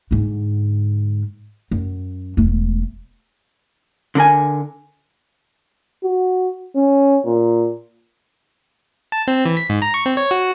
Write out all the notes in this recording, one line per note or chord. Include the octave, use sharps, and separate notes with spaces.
G#2 D3
F#2
E1 A3
D3 D4 A#4 G#5
F#4
C#4
A#2
A5
C4
E3
B6
G#2
A#5
C#6
C4
C#5
F#4